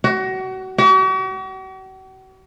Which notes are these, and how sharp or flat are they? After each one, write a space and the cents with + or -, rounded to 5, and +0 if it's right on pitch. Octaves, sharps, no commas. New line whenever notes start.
F#4 +30
F#4 +45